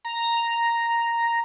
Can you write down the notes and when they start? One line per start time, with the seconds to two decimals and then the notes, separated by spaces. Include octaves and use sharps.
0.05 A#5